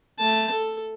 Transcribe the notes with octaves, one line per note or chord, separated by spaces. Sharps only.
A3 A5
A4